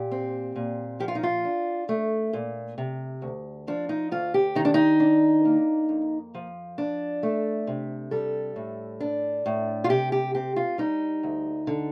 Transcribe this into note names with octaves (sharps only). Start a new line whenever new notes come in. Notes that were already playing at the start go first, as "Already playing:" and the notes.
Already playing: A#2 G4
C4
A#2
F3 G4
F4
D#4
F4
D4
A3
A#2
C3
D2
F3 D4
D#4
D2 F4
G4
D#3 D#4
D4
D#4
D4
A#3
F2
F3
D4
A3
C3
G3 A4
A2
D4
A2
F4
C3 G4
G4
C4 G4
F4
G3 D#4
D2
D3